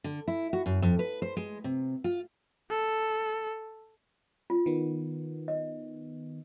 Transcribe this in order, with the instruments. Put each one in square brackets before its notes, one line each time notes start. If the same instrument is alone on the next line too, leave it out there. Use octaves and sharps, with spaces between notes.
[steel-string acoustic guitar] D3
E4
F#4
F#2
F2
B4
C5
G#3
C3
F4
[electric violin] A4
[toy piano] F4
[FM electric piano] D#3 B3
[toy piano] D#5